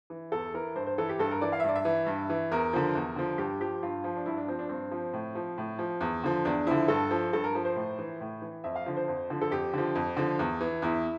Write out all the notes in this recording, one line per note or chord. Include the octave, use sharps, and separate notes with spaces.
E3
E2 A4
E3 A#4
G2 C5
C5
E3 A4
G4
G2 A4
A#4
E3 D5
F5
E5
G2 D5
E5
E3
G2
E3
E2 A#4
D3 F3
E2
D3 F3
G2 G4
F3 G4
G2 F4
F3
D4
G2 E4
D4
F3 C4
D4
G2 C4
F3
A2
F3
A2
F3
E2
D3 F3
E2 D4
D3 F3 E4
G2 A4
F3
G2 A4
A#4
F3
C5
A2
E3
A2
E3
F2 E5
F5
D3 F3
C5
F2
D3 F3
A4
F2 G4
D3 F3
F2
D3 F3
E2
E3
E2 E4